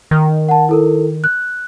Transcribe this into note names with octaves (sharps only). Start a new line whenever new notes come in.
D#3
F#5 A5
E4 A4 A#4
F#6